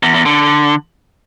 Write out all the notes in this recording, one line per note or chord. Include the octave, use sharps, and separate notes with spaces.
E2
E2
D3